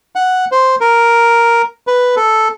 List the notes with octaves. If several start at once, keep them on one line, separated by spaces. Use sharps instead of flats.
F#5
C5
A#4
B4
A4